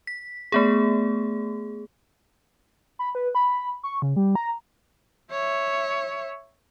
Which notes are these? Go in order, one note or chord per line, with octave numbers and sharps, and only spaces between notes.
B6
A3 B3 G#4
B5
B4
B5
C#6
C#3
G3
A#5
C#5 E5